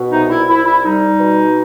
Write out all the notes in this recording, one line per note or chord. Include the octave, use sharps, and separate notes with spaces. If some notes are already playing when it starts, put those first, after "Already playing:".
Already playing: B2
C2 D#4
E4
C2 E4
E4
G3 D#4
B2